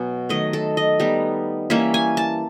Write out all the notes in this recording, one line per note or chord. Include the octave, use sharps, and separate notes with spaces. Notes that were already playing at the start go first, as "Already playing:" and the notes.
Already playing: B2 F#3 B3 G#5
D#3 F#3 A3 D#5
A4
D#5
G3 B3 D#4
E3 G3 A#3 C#4 E5
G#5
A5